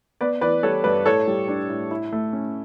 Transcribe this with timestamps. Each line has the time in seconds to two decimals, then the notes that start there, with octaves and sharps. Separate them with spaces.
0.21 B3 B4 D5
0.41 E3 B4 D5
0.63 G3 A4 C#5
0.84 G2 B4 D5
1.05 A2 A4 C#5
1.28 G3
1.48 D4
1.69 A2
1.91 E4
2.13 A3
2.33 C#4